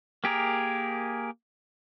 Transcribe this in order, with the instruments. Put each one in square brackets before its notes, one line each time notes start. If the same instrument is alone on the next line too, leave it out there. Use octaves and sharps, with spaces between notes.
[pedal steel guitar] A#3 G4 G#4 A#4